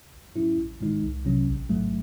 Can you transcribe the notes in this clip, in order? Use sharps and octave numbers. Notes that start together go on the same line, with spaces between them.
G#1
G#2 F#3 C#4 E4
A1
G#2 D#3 G#3 D#4
C2
C3 F#3 C#4
A1
G#2 F#3 A3